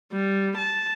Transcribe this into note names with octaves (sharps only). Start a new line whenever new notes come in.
G3
A5